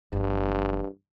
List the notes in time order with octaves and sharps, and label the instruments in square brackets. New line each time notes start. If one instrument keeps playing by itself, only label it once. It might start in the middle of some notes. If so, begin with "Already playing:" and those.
[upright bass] F#1 F3 [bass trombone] G2